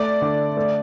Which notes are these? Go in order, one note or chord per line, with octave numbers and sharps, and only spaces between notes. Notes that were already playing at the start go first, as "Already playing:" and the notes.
Already playing: A3 D5
D3
A3